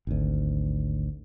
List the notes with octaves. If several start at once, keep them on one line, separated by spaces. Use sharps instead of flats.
G#1 D2